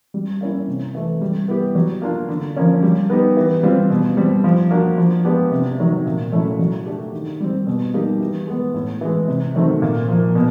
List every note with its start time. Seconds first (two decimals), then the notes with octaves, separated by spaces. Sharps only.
0.14 G3
0.41 A#3 C#4 E4
0.68 C3
0.95 E3 A3
1.21 G3
1.48 B3 E4 G4
1.75 F#3
2.02 A#3 D4 F4
2.29 D3
2.56 F3 A#3 C#4
2.82 G3
3.10 B3 D#4 G4
3.37 E3
3.63 G3 C4 F4
3.90 B2
4.17 G3 C4
4.44 F3
4.71 A#3 D4 F#4
4.98 F3
5.24 G#3 B3 D4 G4
5.52 C3
5.78 D#3 F#3
6.06 A#2
6.32 F#3 A3 C#4 E4
6.59 F#3
6.86 A3 D4 G4
7.13 D#3
7.40 G3 C4
7.67 B2
7.94 G3 A#3 D#4 G4
8.20 E3
8.47 G#3 B3
8.74 A2
9.01 E3 G#3
9.28 C3
9.55 D#3 F#3 A3 C4
9.82 A#2
10.08 F3 A#3
10.35 B2